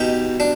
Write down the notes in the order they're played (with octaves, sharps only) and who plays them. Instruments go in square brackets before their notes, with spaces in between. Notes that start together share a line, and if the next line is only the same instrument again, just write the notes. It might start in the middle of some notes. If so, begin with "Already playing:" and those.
Already playing: [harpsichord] B2 D#4 G4
D4